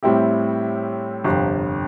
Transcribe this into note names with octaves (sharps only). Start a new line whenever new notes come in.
A2 G3 C4 E4 G4
G1 F2 C3